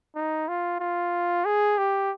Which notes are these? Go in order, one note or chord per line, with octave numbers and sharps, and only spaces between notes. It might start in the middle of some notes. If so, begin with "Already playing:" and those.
D#4
F4
F4
G#4
G4